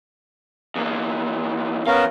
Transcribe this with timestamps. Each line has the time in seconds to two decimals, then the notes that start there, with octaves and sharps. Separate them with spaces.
0.75 E2 A#3
1.87 E3 B3 C#4 A#4 F5